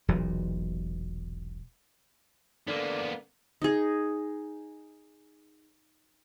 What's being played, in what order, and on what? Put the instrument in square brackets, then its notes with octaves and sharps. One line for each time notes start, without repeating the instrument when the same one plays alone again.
[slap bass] E1 B1 A#2
[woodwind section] D3 [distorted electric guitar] A#3 B3
[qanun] D#4 G#4